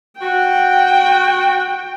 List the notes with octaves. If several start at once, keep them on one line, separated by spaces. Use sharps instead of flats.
F#4 G5